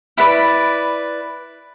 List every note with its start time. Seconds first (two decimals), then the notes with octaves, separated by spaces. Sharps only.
0.17 E4 B4 D5 B5